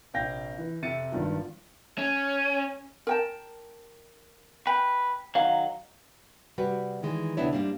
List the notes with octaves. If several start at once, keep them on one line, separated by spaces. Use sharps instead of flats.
A#1 C3 F5 G5 G6 A#6
E3
F2 C3 E5 A6 C#7 D#7
G#1 G2 D#3 F3
C#4
A#4 G5 A5
B4 G5
D#3 F#3 F5
C3 G3 F#4 B4
D#3 E3 G#3
D2 C3 B3 D4 E4 C#5
G#2 F3 G3 A#3 D4